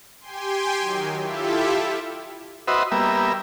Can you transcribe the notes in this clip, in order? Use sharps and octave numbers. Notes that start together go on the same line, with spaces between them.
G4 G5 G#5 C6
D#3 F#3
E4 F4 G4 A4 E5
F#4 B4 C5 D#5 E5
G3 A#3 B3 E5